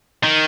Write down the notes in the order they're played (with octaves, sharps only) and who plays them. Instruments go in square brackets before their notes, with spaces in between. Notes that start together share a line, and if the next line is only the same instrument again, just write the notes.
[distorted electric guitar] D#3